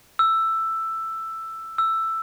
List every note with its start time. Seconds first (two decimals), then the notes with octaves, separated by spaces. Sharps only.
0.19 E6
1.78 E6